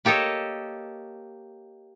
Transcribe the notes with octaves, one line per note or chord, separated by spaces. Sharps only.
A#3 G4 A4 C#5 D#5